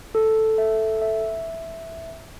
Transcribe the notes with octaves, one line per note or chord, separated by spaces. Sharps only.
A4
E5
E5